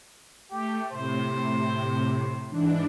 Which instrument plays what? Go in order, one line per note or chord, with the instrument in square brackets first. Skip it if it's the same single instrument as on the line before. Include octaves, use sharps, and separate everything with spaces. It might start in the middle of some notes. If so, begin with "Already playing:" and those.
[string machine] A3 [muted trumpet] G4
[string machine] A2 C3 [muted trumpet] C5
[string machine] G#2 E3 D4